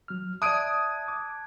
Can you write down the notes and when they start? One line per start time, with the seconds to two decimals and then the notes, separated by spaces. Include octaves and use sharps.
0.08 F#3 F6
0.42 D5 E5 A5 D#6 F#6 G#6 D7 D#7
1.08 D6